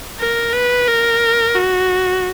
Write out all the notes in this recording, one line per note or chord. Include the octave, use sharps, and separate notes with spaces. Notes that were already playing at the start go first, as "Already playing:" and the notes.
A#4
B4
A#4
F#4